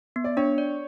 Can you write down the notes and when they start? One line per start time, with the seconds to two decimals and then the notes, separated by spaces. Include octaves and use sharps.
0.16 B3
0.24 D5
0.37 D4 C#5
0.58 D5